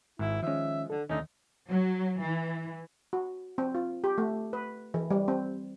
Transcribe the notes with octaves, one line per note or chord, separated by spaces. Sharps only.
G#1 G#2 E4
D#3 F3 G#3 C#4 E5
D3 A4
D#2 D3 D#3 A3 C#4 D#4
F#3
E3
F#4
C4
F4
G4
A3
B4
E3
G3
C4